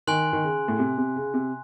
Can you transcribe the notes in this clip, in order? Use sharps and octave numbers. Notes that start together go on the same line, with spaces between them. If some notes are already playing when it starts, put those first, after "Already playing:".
D#3 G#5 C6 F#6
D#3
C#3
A2
C3
C3
C#3
C3